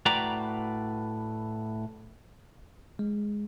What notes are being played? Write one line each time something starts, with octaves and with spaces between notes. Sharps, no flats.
A2 F#4 B4 D5 G5 A#5
G#3